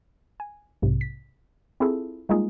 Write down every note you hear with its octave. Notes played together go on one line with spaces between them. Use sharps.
G#5
B1 G#2 C3
B6
C4 E4 F4 G#4 A4
G3 G#3 A#3 D#4 F4 G#4